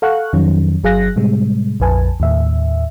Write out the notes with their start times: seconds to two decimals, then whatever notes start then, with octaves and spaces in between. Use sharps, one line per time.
0.02 A4 F5 F#5 C#6 F#6
0.33 F2 D#3 F#3 C#4
0.83 G1 F#3 G#4 F5 F#6 A#6
1.16 A2 C3 G3 G#3
1.80 A#1 F2 B4 G#5 A5
2.20 D#2 A2 E5